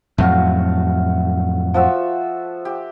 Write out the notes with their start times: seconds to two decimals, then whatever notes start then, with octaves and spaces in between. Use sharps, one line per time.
0.18 F2 A2 F#3 A3 F#4 F5
1.74 F3 F#4 E5
2.65 G4